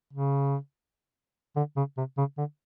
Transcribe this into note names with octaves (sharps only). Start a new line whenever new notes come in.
C#3
D3
C#3
C3
C#3
D3